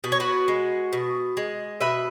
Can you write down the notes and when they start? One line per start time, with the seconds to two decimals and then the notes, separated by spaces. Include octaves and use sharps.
0.04 B2 B4
0.12 C#5
0.20 F#4 B4
0.48 G#3
0.93 B2
1.37 G#3
1.81 B2 B4 E5